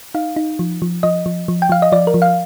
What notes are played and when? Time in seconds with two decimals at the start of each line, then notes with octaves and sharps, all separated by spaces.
0.15 D#4 F5
0.36 D#4
0.59 F3
0.82 F3
1.03 F3 D#5
1.26 F3
1.48 F3
1.62 G5
1.69 F3 F5
1.82 D#5
1.92 F3 D5
2.07 A#4
2.14 F3
2.22 F5